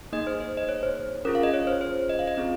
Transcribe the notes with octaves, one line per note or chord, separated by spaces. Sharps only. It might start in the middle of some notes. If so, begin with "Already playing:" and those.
A#3 D#4 G#4 D#5
C5
C5
D#5
C#5
C5
C#4 F4 G#4 A#4
F5
D#5
C#5
C5
C5
D#5
F5
D#5
C4 F4 G#4